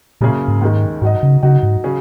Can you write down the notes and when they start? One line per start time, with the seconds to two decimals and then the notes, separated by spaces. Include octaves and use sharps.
0.21 F#2 A#2 C#3 A#3 C#4 G#4
0.48 G#2
0.61 D#2 D#3 G#3
1.02 G#2 F#3 D#4 F#4 D#5
1.23 C#3
1.42 C#3 F#3 D#4 F#4
1.63 G#2
1.84 C#3 F#3 C#4 G#4